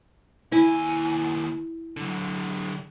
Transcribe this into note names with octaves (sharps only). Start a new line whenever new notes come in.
D#2 E4 G#5
D3 F#3